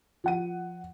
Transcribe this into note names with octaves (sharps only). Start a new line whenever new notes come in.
F3 F#5 D#7